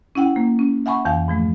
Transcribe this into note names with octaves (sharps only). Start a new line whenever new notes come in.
C#4 E4 F#5 G5
A#3
C#4
E5 F#5 G#5 B5 C#6
F2 E3 F5 G5
G#2 F3 A3